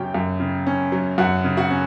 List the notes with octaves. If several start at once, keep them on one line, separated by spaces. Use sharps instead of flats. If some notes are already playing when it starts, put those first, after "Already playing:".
Already playing: F#2 C#3 F#3 C#4 G4 G5
F#2
C#3
C#4
F#3
F#2 F#4 F#5
C#3
F#4 F#5
C#4